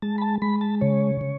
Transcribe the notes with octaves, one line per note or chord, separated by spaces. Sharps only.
G#3 A5
B5
A5
G#3 B5
A5
C#3 C#5
C#3